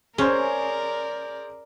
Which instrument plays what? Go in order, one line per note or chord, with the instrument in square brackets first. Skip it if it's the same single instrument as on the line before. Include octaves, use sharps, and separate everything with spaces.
[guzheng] C#4 [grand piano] G#4 C5 [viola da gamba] A#4 D5